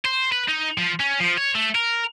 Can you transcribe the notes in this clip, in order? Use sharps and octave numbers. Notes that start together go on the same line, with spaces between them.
C5
B4
D#4
F3
C#4
F3
C#5
A3
A#4